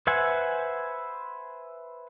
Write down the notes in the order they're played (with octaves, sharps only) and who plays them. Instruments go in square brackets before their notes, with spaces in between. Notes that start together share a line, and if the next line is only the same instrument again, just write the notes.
[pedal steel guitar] B4 C5 E5 F#5 G#5